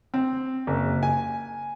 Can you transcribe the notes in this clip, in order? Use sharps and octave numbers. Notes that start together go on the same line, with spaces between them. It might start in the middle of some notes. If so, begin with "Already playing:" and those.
C4
F#1
G#5